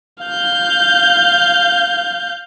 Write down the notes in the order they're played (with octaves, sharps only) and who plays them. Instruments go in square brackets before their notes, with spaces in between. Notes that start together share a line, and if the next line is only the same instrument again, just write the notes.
[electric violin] F5 G6